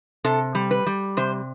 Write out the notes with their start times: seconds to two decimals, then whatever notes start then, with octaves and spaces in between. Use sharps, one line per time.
0.24 C3 A4
0.55 G3
0.71 B4
0.87 G3
1.17 C3 C5